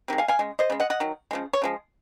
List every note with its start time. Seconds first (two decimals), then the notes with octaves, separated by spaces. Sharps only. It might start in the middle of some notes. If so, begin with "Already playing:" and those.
0.08 C3 D#3 G#3
0.18 F5 G#5
0.28 F5 G#5
0.39 C#3 G#3
0.59 C5 D#5
0.70 C#3 G#3
0.80 D#5 F#5
0.90 D#5 F#5
1.00 D#3 F#3
1.31 C#3 F3 G#3
1.53 C#5
1.62 C#3 F3 G#3